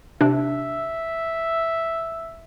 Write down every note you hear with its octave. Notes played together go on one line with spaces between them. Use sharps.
C3 D4 E5